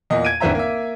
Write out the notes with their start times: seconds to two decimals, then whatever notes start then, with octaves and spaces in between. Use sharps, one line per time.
0.10 E2 A#2 A#3 D#5
0.25 G#6 D7 D#7
0.40 G#1 D3 E3 C5 E5 A#5
0.55 A#3 E5